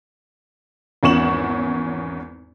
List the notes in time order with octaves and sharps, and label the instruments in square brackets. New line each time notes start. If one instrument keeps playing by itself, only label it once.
[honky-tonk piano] G#1 E2 C#4 C#6 E7 F#7